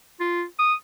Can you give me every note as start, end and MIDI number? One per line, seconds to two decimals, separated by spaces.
0.20 0.44 65
0.59 0.74 87